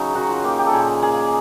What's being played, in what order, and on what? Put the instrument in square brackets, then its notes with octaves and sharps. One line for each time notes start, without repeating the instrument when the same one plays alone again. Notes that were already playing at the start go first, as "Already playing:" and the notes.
Already playing: [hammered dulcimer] C#3 F#3 D#4
D#3 F#4
F4
A#3 G4
G4
A4
A#2 G#4
A#3 G#4